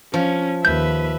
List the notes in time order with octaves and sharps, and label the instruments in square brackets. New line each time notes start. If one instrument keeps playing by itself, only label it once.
[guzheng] F3 [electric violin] C#4
[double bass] D#2 [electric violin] B4 E5 [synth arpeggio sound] G6